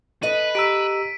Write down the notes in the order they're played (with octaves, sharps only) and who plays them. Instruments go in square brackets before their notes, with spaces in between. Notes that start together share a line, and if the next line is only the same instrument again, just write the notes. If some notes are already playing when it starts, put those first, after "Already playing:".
[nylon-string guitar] A4 D#5 [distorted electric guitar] B4 [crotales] D#7
[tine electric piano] G4 A#5 E6 [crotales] B6 D7